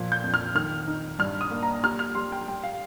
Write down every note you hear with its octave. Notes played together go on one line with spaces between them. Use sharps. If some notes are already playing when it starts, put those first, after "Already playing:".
Already playing: A#2 F3
G6
F2
F6
D#3 F6
D#4
G2 F6
D#6
A#3
A#5
G3 F6
F6
G3 C6
G5
G3 G5
F5